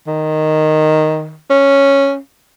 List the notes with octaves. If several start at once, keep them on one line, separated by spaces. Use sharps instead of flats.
D#3
C#4